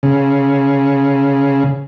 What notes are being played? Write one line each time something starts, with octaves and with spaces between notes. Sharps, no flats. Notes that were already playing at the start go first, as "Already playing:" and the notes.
C#3